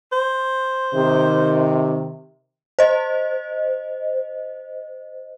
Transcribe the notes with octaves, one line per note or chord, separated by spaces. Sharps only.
C5
C3 D#3
C5 D#5